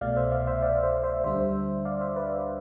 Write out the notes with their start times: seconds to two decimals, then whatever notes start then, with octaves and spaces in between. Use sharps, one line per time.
0.01 C2 B2 A3 D5 F5
0.17 C5 E5
0.32 D5 F5
0.47 C5 E5
0.62 D5 F5
0.83 C5 E5
1.03 C5 E5
1.24 D2 D3 G3 D4 C5 E5
1.85 D5 F5
2.01 C5 E5
2.16 B4 D5